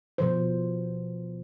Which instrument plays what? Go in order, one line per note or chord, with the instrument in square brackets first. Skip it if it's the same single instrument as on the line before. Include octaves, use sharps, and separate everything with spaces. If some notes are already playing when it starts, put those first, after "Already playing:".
[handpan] B2 F3 C5